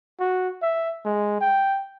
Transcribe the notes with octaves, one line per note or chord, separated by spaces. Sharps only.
F#4
E5
G#3
G5